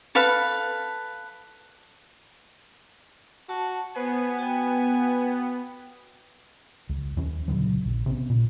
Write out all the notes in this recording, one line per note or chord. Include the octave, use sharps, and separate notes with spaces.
A4 B4 F5 B5
F#4 A5
B3 C5 G#5
F#4 G5
C#2
D#2 C#4
D#1 C#2 D3 F#3
A#1
C3 B3 C#4
A#2